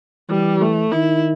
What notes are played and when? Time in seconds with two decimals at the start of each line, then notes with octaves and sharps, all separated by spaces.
0.29 E3 G3
0.61 A3
0.92 D#3 E4